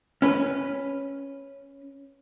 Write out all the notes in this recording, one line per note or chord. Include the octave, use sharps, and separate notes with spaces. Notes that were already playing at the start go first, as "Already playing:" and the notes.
C#4 B4